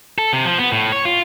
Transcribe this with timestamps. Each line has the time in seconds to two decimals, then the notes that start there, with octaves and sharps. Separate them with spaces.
0.18 A4
0.33 C3
0.45 F3
0.59 B3
0.72 A2
0.92 C#5
1.05 F4